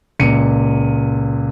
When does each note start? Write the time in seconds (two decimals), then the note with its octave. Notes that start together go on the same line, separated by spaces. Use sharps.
0.19 C#2 A#2 C#7 D#7